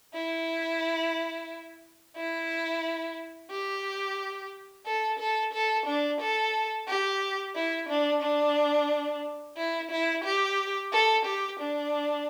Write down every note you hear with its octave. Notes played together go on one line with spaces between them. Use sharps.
E4
E4
G4
A4
A4
A4
D4
A4
G4
E4
D4
D4
E4
E4
G4
A4
G4
D4